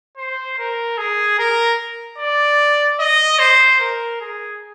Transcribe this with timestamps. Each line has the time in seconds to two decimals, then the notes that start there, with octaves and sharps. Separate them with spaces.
0.17 C5
0.58 A#4
0.98 G#4
1.39 A#4
2.18 D5
3.00 D#5
3.39 C5
3.80 A#4
4.21 G#4